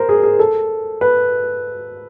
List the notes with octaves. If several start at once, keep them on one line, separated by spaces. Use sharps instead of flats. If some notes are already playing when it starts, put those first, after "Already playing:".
Already playing: A#4 C5
G#4
G#4
A4
B4